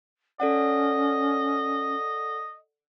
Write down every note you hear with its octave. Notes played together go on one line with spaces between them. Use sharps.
C#4 A4 D5 D#5 F#5